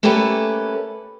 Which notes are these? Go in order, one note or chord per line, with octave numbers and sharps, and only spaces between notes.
A3 A#3 C#4 G4 A4 B4